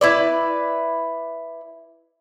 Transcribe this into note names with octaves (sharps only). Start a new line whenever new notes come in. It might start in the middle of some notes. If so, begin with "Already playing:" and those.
E4 B4 D5